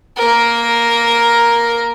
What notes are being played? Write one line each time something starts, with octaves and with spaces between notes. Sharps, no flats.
A#3 A#4